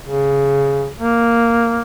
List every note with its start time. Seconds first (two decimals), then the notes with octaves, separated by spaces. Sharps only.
0.03 C#3
0.99 A#3